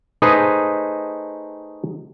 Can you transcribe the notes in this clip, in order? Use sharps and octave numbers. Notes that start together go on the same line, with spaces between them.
A3 D#4 G#4 B4 C5 D#5